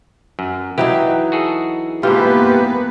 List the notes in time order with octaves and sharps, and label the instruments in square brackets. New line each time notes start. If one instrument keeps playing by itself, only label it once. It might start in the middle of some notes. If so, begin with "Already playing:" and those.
[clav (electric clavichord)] F#2
[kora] E3 F#3 D#4 [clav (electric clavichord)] G4 G5
[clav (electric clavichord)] F#4 G#4 A4
[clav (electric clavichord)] G#2 B2 E3 [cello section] A#3 B3 B4 [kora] F4 [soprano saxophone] G4